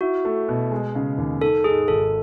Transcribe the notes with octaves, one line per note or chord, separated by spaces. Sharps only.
E4 F#4
A3
B2
G#3
C#3
D#2
D#3 A4
G#2 G#4
G#1 A4